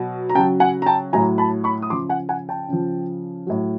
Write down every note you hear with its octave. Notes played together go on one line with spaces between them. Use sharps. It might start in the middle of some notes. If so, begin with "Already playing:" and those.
Already playing: B2 F#3
A#5
C#3 F#3 G5 A5
F#5 G#5
A#5
G5 A5
A2 F#3 G#5 A#5
A5 B5
B5 C#6
D#6
C#3 F3 C6 D6
F#5 G#5
F#5 G#5
G5 A5
C#3 F3
A2 F#3